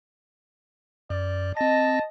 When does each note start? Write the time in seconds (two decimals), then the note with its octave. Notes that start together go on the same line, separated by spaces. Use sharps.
1.10 F#2 D5
1.57 C4 D#5 A5 A#6